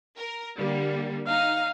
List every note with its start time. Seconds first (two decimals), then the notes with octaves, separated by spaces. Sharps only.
0.17 A#4
0.58 D3 G3 A#3
1.27 D#4 F5